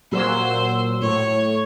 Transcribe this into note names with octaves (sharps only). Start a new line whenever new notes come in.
A#2 F#3 C5 E6
A2 C#5